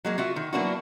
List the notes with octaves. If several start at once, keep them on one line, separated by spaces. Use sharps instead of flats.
F#3 G#3 A#3
F4 F#4 E5
D#3
F#3 A#3 B3 D4 E4 F#4